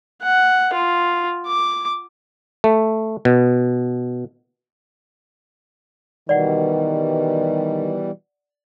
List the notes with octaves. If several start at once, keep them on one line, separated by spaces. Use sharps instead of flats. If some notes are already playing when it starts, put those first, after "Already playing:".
F#5
F4
D6
A3
B2
B2 D#3 E3 G3 D5 F#5